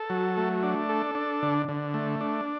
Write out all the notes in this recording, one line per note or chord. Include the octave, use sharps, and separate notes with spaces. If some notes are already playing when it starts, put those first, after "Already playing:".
Already playing: A4
F#3
A3
D4
A4
D4
D3
D3
A3
D4